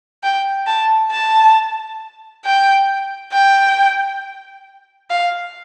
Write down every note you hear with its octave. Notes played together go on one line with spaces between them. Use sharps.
G5
A5
A5
G5
G5
F5